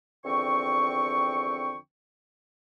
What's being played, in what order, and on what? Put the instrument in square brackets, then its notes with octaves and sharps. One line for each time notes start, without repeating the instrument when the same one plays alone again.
[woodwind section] E2 D3 F3 C4 G5 C#6